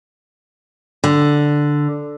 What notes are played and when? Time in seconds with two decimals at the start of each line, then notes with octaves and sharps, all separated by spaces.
1.04 D3